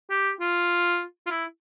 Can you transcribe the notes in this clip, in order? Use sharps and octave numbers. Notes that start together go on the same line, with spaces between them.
G4
F4
F4
E4